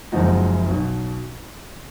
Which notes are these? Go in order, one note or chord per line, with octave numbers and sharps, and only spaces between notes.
F#1 F#2 F3 G#3 D#4 F#4
B1 B2 F#3